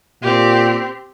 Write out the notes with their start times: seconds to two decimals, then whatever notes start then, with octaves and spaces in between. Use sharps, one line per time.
0.22 A#2 C4 G4